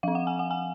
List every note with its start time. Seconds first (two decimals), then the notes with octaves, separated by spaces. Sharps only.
0.03 F3 C4 F5
0.15 F#5
0.27 G#5
0.39 F#5
0.51 G#5